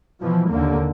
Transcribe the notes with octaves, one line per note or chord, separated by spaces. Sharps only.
B2 E3 F3
D#2 D3 A#3